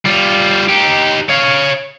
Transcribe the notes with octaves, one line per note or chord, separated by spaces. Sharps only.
G3 F4
D#4 G4
C#5 F5